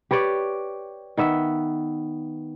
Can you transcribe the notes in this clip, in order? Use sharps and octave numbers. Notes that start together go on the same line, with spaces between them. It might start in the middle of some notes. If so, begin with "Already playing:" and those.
G4 B4 C#5 D5
D#3 B3 E5